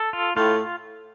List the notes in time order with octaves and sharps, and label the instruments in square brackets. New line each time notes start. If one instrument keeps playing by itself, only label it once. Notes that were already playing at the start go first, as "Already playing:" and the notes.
Already playing: [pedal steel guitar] A4
F4
[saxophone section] A2 [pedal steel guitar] F4